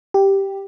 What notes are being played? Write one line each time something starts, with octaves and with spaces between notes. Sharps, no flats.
G4